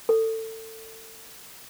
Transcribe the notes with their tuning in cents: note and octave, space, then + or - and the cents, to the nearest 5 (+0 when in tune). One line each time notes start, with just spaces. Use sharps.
A4 +25